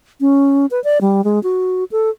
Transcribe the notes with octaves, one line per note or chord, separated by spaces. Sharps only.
C#4
B4
D5
G3
G#3
F#4
A4